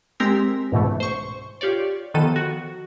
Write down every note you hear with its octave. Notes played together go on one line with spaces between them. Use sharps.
G#3 C4 G4 A#4 E6 B6
C#2 G#2 B2 E3 A3
C5 C#6
F4 G4 C#5 D5
D#3 F3 B3 A4 D#7
F#4